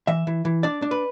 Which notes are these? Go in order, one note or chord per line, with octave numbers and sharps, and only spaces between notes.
E3 E5
E3
E3
D4 D5
D4
B4